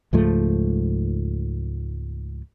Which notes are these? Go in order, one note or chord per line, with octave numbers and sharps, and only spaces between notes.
C#2 G#2 F3 A3